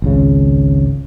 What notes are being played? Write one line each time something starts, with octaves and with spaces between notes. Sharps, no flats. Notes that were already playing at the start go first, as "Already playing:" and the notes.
G#1 C#2 C#3